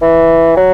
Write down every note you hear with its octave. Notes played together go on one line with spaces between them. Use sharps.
E3
F#3